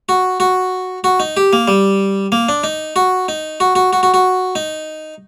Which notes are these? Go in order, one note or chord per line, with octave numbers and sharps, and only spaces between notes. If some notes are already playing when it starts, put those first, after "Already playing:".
F#4
F#4
F#4
D#4
G4
A#3
G3
A#3
D4
D#4
F#4
D#4
F#4
F#4
F#4
F#4
F#4
D#4